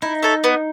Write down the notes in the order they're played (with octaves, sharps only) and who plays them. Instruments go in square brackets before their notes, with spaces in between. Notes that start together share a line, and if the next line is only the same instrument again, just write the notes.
[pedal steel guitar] D#4 [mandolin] E4
[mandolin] A4 C#5 E5
B3